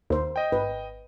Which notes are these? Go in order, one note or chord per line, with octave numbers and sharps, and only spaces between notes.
D#2 A#4 C5
D#5 G5
G#1 B4